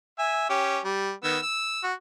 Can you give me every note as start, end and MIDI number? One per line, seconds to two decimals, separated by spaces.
0.19 0.49 76
0.19 0.49 80
0.49 0.79 61
0.49 0.79 67
0.84 1.12 55
1.24 1.38 51
1.24 1.38 59
1.24 1.38 88
1.43 1.82 88
1.84 1.93 66